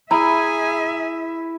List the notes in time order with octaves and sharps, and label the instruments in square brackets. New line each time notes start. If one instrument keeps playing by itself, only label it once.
[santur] E4 [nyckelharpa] G#4 G#5 [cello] E5 [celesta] A#5